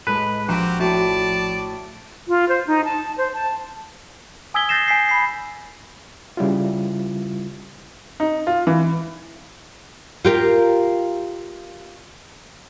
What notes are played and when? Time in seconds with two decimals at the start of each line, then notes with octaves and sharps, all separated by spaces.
0.07 A2 G#3 A4 B4 A5 B5
0.48 A#1 F3 C4 D4 F#4 G4 G5 A#5
0.80 A2 F#4 D5 A5
2.28 F4
2.49 C5
2.67 D#4
2.85 A5
3.18 C5
3.34 A5
4.54 G#5 D#6 E6 G#6 B6 G7
4.69 G6 A6 A#6 C7 E7
4.88 G#5 B6 C7
5.09 B5 C7
6.37 C#3 G3 E4 F4
8.20 D#4
8.47 F4
8.67 E3
10.25 F4 G4 A#4